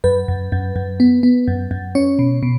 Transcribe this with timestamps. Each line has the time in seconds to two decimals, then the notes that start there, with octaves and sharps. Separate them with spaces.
0.04 F#2 B4
0.28 F#2
0.52 F#2
0.76 F#2
1.00 B3
1.23 B3
1.48 F#2
1.71 F#2
1.95 C#4 C#5
2.19 B2
2.43 B2